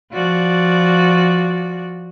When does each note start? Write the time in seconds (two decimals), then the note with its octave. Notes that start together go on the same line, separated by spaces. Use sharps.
0.12 F3 F#4 D5